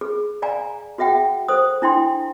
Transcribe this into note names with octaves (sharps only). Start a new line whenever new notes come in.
G#4
D5 F5 G#5 A#5
F#4 G#4 E5 F#5 G5
A4 C5 D#6
D4 E4 G5 C6